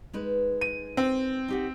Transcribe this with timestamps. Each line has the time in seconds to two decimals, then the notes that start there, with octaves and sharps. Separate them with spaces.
0.13 G#3 D#4 B4
0.61 D#7
0.97 C4
1.48 D#4 G4 F#5